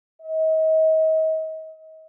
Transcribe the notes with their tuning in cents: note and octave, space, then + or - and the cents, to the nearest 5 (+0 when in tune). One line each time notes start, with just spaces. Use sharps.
D#5 +35